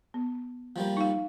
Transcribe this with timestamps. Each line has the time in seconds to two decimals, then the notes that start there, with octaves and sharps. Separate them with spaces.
0.14 B3
0.76 F3 G3 A#3
0.97 D#4 F5